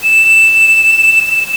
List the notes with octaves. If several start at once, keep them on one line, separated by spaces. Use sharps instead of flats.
E7